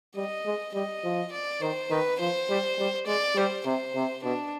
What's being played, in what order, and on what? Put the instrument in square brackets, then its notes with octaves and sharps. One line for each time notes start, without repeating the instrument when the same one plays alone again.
[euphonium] G3 [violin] D#5
[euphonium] G#3
[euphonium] G3 [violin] D#5
[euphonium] F3
[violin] D5
[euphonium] D#3 [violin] C5
[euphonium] D#3 [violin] B4
[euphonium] F3 [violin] C5
[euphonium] G3
G3
[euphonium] G#3 [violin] D5
[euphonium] G3 [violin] C5
[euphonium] C3 [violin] C5
[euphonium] C3
[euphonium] B2 [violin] D4